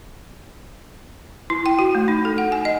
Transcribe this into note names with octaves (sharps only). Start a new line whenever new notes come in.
E4
G5
F#4
A3
D#4
A4
F#5
G#5
D#5